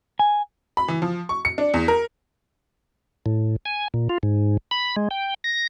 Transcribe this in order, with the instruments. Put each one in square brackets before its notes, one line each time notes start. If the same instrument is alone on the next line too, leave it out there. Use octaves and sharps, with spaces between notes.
[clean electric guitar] G#5
[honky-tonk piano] B5
E3
F3
C#6
C#7
D4
E2
A#4
[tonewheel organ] A2
G#5
A#2
F4
G#2
B5
G#3
G5
A#6